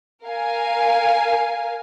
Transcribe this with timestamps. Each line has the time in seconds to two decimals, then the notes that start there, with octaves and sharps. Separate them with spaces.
0.24 A#4 F5 G#5